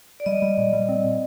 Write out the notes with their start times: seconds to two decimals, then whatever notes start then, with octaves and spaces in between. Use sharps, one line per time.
0.20 D5
0.26 G3 D#5
0.42 G3
0.58 A#2
0.73 G3
0.89 C4
1.04 A#2